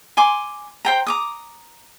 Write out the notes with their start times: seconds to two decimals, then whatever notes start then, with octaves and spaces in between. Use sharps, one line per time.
0.17 G#5 C6 D6
0.85 C5 G5 A#5
1.07 A#5 D6 D#6